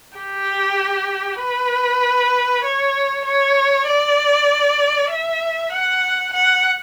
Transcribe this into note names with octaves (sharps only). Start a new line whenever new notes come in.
G4
B4
C#5
C#5
D5
E5
F#5
F#5